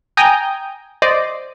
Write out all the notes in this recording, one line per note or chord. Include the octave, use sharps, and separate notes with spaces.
G5 G#5 A#5 D#6 G6
C5 D5 D#5